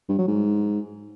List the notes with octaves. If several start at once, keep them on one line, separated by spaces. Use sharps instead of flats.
G2
F#3
G#2